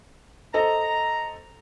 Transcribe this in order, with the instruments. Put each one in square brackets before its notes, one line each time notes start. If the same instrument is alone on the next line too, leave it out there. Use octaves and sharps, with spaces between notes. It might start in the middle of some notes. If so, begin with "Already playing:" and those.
[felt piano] A4 C5 D#5 [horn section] A#5